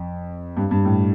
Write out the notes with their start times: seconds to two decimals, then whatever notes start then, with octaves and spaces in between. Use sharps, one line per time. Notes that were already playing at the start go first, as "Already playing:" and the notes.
Already playing: F2
0.57 G2
0.71 G2
0.85 A2